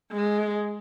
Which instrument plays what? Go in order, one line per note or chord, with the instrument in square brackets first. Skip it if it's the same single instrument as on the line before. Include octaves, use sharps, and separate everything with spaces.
[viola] G#3